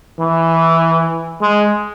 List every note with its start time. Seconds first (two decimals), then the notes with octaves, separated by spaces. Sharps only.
0.20 E3
1.42 G#3